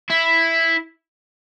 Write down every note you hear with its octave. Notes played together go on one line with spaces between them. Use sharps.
E4